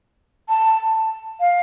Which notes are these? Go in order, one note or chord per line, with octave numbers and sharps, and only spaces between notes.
A5
F5